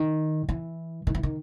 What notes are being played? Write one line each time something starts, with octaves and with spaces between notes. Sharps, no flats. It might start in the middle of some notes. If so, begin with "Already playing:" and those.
Already playing: D#3
E3
D#3
E3
D#3